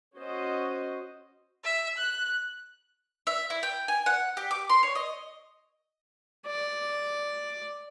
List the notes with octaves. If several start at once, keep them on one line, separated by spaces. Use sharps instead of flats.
C#4 F#4 C5 D#5
E5
F#6
E5
E4
G5
G#5
F#5
G4
D6
C6
C#5
D#5
D5